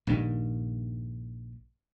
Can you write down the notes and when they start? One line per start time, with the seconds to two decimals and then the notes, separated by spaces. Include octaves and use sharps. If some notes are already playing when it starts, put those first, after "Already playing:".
0.07 A#1 G2 D#3